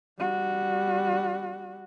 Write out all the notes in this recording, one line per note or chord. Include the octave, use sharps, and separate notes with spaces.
G3 F#4